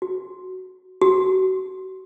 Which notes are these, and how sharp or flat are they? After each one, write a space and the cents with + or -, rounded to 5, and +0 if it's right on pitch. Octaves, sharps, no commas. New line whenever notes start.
F#4 +5
F#4 +30